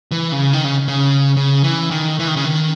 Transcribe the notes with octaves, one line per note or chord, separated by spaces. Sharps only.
E3
C#3
D#3
C#3
C#3
C#3
E3
D#3
E3
D#3
C#3
D#3